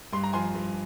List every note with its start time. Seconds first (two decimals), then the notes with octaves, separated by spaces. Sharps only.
0.13 G2 C6
0.24 A#5
0.33 F3 G#5 C6
0.55 G2